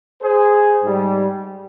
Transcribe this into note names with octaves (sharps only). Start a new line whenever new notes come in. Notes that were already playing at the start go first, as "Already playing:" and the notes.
G#4 C5
G#2 G3